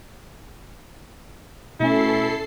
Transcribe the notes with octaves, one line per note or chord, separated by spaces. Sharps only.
B2 A3 C#4 E4 A4 C7